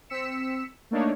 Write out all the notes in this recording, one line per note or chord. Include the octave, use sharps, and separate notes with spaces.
C4 E6 B6 C#7 E7
A3 A#3 D4 D#4 C#5